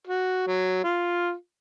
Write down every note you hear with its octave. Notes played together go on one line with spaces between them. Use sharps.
F#4
F#3
F4